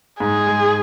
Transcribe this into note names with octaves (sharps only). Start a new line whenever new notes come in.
G#2 G#4
G#3